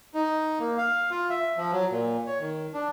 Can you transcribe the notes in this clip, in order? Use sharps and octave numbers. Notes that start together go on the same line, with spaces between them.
D#4
A#3
F5
F4
E5
F3
F#3
A#2
C#5
D#3
D4